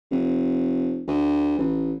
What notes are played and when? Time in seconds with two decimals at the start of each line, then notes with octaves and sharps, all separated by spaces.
0.11 F1
1.07 D2
1.58 A1